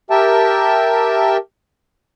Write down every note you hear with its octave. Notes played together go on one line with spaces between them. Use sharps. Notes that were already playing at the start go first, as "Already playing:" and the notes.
G4 A#4 E5 G5 A5